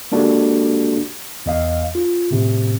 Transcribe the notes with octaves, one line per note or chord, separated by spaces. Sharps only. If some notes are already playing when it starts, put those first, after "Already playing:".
G#3 A#3 D4 F#4 G4 A4
E2 D#5 F5
F4
A2 C3 D#3